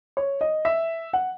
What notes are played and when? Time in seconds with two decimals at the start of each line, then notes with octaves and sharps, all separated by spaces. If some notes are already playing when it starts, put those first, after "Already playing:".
0.17 C#5
0.41 D#5
0.65 E5
1.13 F#5